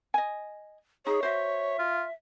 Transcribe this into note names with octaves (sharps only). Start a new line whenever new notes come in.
D#5 G#5
D#4 G#4 C#5
F#4 C5 E5
F4